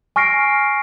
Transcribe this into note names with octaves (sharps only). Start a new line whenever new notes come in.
G#5 C#6 F6 A#6 C7 D7